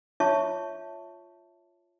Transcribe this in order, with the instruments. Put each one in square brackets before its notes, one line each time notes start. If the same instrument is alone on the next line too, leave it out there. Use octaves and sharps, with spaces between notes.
[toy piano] F4 C#5 E5 A5 C#6